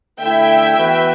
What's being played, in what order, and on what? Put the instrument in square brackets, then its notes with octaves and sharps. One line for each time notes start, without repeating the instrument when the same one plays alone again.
[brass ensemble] D3 A3 E4 [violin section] E5 G5
[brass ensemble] E3 B3 F#4 B4